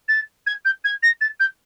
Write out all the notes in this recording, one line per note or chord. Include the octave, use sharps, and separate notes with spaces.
A6
G#6
G6
G#6
A#6
A6
G6